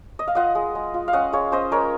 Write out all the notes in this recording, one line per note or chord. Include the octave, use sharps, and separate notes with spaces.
D#5
F5
F4 D#5 F#5
G#3
G#3
F4
F5
C#4 D#5 F#5
G#3 C#5 F5
C#4 C5 D#5
G#3 A#4 C#5